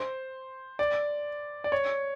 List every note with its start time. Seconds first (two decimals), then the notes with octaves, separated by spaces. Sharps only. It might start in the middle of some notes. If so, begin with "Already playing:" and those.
Already playing: C5
0.79 D5
1.64 D5
1.72 C#5